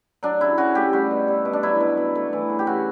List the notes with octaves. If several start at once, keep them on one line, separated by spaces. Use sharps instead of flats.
F#3 D4
C#3 E4
C#3 F#4
A3 G4
G3 F#4
B2
G3
B2
D4
F#3 E4
B2
B2
A3
E3
C#3
G4
C#3 F#4